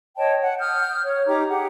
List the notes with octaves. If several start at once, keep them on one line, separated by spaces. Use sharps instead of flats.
C#5 D#5 G5 A5
F#5
D#6 F6 G6
C#5
D#4 G4 A#5 D6
G4 G#4 F#5